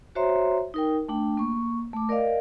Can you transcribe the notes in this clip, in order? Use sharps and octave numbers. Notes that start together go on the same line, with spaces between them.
F#4 C5 C#5 E5 A#5 C6
D#4 A#4 G5
A3 D4 G5
A#3 C#6
A3 D6
A#4 D5 D#5 F5